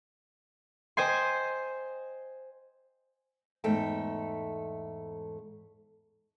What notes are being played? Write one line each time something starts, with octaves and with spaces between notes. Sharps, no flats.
C5 D#5 G5 G#5 C6
E2 G#2 A3 A4 G5